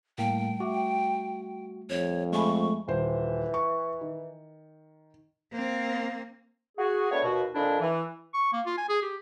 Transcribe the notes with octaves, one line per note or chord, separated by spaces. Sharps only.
A2 G3 A3 A#3 G5
A3 F#4 E5 D6
F2 C#5
G#3 A3 E5 G#5 B5 C#6
D#1 E3 C5
C#6
D#3
A#3 C4
F#4 G#4
A3 B3 D4 C#5
D#2 B2 F#4
F2 A#2 D#3 D4 E4
E3
C#6
A#3
F4
G#5
G#4
G4